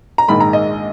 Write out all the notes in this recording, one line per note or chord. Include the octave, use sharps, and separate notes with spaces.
A#5
A#1 G#2 D#3 G#3 B5
A#5
D#5